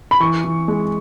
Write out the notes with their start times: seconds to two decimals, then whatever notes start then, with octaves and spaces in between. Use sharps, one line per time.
0.11 B5
0.20 E3 C#6
0.44 E3
0.68 G#3